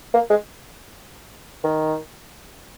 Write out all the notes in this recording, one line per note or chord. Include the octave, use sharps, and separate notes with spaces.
A#3
G#3
D#3